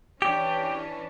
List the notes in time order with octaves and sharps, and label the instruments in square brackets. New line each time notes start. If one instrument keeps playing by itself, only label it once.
[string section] E3 C#4 D4 [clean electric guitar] G4